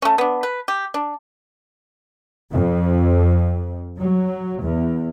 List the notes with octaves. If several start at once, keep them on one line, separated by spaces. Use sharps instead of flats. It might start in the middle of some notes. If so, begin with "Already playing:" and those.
A3 C#4
B3 D4
B4
G4
D4
F2
F#3
E2